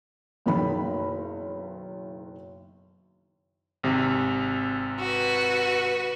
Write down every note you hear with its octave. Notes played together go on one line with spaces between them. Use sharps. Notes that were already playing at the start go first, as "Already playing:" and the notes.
F#1 B1 D#3 B5
G#1 C3
F#4 B4